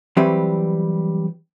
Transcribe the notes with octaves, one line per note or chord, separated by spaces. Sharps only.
E3 F#3 G3 C4 G4 B4